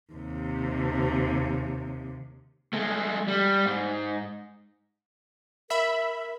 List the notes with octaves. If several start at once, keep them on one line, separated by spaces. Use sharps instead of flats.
D#2 C3
G#3 A3
G3
G#2
A#4 E5 B5